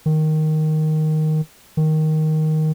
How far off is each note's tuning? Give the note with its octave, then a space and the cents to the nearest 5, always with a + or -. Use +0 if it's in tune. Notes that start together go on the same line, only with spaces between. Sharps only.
D#3 +0
D#3 +5